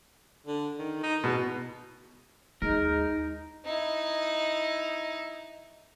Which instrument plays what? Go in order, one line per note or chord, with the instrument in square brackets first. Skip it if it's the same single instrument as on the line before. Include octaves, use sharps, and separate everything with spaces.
[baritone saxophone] D3
D#3
D#4
[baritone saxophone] E2 [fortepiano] B2
[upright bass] D#2 [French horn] G#3 [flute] D#4 [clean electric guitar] A#4
[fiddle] D#4 E4